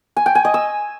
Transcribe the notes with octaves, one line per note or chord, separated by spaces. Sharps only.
G#5
G5
G#5
D#5
E6